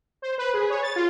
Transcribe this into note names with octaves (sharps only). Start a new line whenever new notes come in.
C5
B4
G#4
C#5
A6
F4